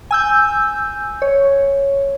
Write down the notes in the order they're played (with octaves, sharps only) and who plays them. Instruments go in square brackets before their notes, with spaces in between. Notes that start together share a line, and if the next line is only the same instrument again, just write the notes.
[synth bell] G#5 E6 G6
C#5